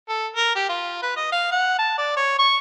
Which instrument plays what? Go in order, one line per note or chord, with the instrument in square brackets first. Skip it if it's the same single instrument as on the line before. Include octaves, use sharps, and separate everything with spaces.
[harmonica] A4
A#4
G4
F4
B4
D#5
F5
F#5
A5
D5
C#5
C#6